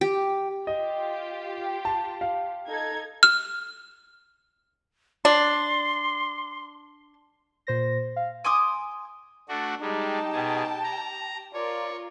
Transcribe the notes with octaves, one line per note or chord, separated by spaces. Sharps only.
G4
F4 G4 D#5
A5
F5
D#4 A4 G#6
F6
D4 C6
A#2 C5 A#6
F5
G#5 C6 D6 D#6
A3 D4 F#4
G3 G#3 D#4 G4 G5 A5
B2 G#4
A#5
F4 A#4 C#5 D5